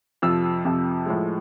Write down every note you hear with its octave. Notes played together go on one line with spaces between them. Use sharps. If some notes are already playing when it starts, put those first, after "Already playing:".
F2 C3 F3 E6
F2 C3 F3
A2 F3 G#3